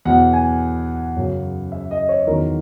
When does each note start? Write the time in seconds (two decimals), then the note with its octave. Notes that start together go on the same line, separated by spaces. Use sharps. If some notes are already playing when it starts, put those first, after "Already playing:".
0.05 E2 B2 F#3 F#5
0.33 G#5
1.16 F#2 C#3 F#3
1.72 E5
1.91 D#5
2.09 C#5
2.27 E2 D#3 F#3 A#4